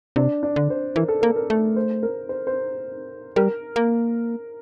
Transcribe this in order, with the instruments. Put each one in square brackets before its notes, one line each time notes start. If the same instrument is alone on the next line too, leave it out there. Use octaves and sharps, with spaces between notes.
[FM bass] C3 [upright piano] D4
[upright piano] D4
[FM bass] D3
[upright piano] C5
[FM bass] E3 [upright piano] A#4
[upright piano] A4
[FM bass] A#3 [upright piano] A#4
[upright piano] A#4
[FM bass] A3
[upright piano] C5
A#4
C5
C5
[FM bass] G3 [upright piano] A#4
[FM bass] A#3